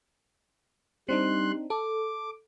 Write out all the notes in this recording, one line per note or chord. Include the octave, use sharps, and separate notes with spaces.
G3 C4 D4 D#4 C6 F#6
A4 D6